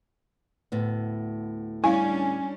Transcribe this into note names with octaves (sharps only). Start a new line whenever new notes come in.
D2 A2 B3
G3 C#4 D4 E4 F5 G#5